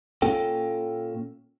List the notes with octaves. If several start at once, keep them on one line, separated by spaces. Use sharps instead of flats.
A#2 A#3 C#4 A4 G5